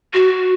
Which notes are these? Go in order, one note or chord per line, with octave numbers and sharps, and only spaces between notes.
F#4